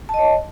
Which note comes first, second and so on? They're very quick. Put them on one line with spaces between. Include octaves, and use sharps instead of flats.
A5 D#5 C#5